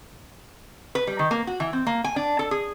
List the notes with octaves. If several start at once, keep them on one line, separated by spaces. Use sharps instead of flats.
B4
G3
D#3
A#3
F#4
E3
C4
A#3
G#5
D4
A4
G#4